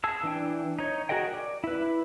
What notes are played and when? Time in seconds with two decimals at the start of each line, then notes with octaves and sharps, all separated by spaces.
0.04 G#4 A5 E6
0.23 E3 D4 G5
0.79 D#4 C#5
1.09 F#4 G#4 A#4 D#5 G5
1.34 D5
1.64 E4 B4